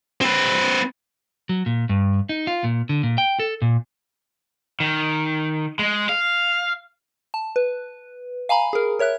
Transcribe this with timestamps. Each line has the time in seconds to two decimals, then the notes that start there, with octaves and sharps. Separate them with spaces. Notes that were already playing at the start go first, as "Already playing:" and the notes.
0.21 C4 B4
1.49 F#3
1.66 A#2
1.89 G2
2.29 D#4
2.47 F4
2.64 A#2
2.89 D3
3.03 A#2
3.18 G5
3.40 A4
3.62 A#2
4.80 D#3
5.79 G#3
6.09 F5
7.34 A5
7.56 B4
8.49 F5 G#5 A#5 B5
8.73 G#4 A#4
8.99 A#4 C#5 E5 F#6